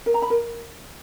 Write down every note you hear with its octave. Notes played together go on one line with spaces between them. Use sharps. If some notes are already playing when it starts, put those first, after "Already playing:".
A#4
A#5
B5
A#4